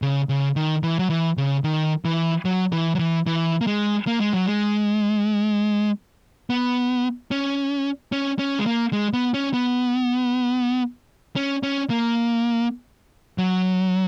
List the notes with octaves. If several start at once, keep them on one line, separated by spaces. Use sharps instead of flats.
C#3
C#3
D#3
E3
F#3
E3
C#3
D#3
E3
F#3
E3
F#3
E3
E3
A#3
G#3
A#3
G#3
F#3
G#3
B3
C#4
C#4
C#4
G#3
A#3
G#3
B3
C#4
B3
C#4
C#4
A#3
F#3